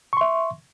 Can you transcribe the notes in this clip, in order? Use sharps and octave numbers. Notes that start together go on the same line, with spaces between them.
E5 C6 C#6